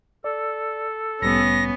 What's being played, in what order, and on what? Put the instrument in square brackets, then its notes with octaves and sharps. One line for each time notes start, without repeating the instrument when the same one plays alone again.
[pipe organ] A4 [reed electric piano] D5
[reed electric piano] C2 A2 G3 [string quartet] B3 C#4 [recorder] A#6